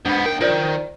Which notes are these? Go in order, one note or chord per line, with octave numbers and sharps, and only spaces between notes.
G#2 B3 D4
D#2 A#4 G5
D#3 F4 C5 D5